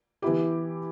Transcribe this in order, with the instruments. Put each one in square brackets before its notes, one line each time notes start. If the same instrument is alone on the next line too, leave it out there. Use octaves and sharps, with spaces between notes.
[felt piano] E3 B3 E4 G4